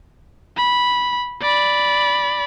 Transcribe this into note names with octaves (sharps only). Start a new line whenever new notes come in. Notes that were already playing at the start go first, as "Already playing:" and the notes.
B5
D5 B5